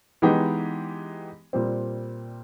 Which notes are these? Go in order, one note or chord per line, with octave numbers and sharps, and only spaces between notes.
E3 G#3 B3 D#4 G4
A#2 G3 C4